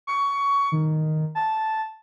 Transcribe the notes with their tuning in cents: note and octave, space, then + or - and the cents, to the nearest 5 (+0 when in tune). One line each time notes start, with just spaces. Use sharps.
C#6 +20
D#3 +0
A5 -5